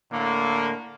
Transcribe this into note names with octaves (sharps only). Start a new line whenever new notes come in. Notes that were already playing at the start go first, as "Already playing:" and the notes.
A2 D3 A#3